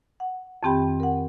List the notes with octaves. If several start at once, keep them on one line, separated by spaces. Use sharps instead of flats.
F#5
F2 D#3 C4 G4 G5 B5
A#4 F#5